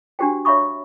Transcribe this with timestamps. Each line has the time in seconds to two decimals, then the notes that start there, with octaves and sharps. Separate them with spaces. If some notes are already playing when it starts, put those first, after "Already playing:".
0.19 D4 F#4 G4 C5 G5
0.45 C#5 E5 F5 B5 C#6 D#6